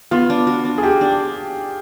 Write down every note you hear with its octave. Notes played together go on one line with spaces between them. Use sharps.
B3 F4
D4
F#4
D4
G#4
F#4 G4
D4